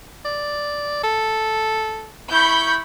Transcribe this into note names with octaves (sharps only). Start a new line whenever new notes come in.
D5
A4
E4 B5 C#6 G6